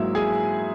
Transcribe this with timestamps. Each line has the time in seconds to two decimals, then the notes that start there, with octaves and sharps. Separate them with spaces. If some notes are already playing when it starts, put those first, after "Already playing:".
Already playing: G#2 F#3 A#3 E4 E5
0.15 G#4 G#5